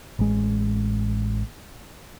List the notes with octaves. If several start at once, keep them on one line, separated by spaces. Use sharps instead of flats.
A1 G#3